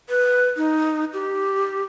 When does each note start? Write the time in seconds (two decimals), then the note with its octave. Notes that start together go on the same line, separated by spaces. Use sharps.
0.09 B4
0.57 D#4
1.13 G4